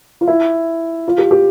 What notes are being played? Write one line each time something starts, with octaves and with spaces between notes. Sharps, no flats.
F4
E4
F4
G4
G4